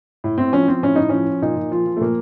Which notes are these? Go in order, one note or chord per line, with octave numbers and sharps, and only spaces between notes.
A2
A2 C4
F3 C#4
F3 C4
A2 C#4
A2 D#4
F3 C#4
F3
A#2 D#4
A#2
F3 F4
F3
A3
A#2 A#3